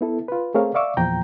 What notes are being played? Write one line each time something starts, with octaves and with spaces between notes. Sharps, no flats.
B3 E4 A4
F4 B4
A3 C4 G#4 A#4 C#5 F5
D5 E5 F5 C#6 D6 E6
E2 A#2 F3 G5 A#5 G6